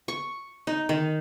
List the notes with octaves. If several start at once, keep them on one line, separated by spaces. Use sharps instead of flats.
C#6
D#4
D#3